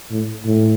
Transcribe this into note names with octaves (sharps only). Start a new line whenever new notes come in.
A2
A2